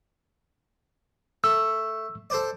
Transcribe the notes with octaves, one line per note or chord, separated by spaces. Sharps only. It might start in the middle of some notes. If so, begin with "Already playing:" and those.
A3 E6
A4 C5 D5